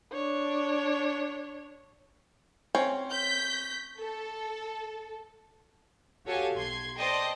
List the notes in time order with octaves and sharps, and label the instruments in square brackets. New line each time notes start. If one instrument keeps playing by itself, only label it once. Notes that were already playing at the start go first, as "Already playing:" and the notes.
[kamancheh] D4 C#5
[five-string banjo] C4 C#4 C#5
[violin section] G6 B6
A4
[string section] F#4 G4 A4 C#5 F5 G#5
B1 C6 G#6
C5 D5 D#5 G5 A5